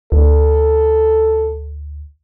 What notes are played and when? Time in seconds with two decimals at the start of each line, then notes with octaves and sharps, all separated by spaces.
0.12 D2 A4